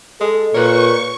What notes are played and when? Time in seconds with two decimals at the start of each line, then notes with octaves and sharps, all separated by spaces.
0.20 G#3 A4
0.54 A#2 A#4 B4 C#5 C#6